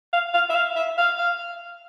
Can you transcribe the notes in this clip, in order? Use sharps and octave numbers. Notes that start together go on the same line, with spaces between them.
F5
F5
E5
F5
E5
F5
F5